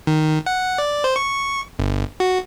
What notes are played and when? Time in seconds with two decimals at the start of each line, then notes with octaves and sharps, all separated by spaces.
0.07 D#3
0.46 F#5
0.78 D5
1.04 C5
1.16 C#6
1.79 G1
2.20 F#4